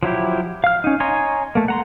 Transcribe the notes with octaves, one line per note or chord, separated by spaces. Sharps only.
F3 F#3 E4 G4
F5 F6
C#4 D#4
C#5 D#5 G#5 A#5 C6
A3 A#3
F#5 A#5 C6